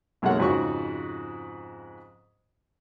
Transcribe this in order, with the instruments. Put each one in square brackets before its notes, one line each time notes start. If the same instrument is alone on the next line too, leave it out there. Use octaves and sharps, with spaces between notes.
[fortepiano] B1 F#2 G#3 A#3 C#5 F#5
F2 G#2 C#3 F#4 C#6